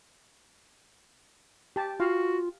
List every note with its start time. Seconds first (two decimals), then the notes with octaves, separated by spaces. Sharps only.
1.76 G4 A5
2.00 F4 F#4 F5